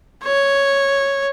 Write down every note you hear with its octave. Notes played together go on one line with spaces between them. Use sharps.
C#5